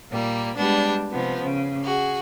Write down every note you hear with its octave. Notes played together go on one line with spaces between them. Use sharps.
A#2 G3 A#3
G3 G#3 B3 D4
C3 F3 B3
C#3
F#4 G#4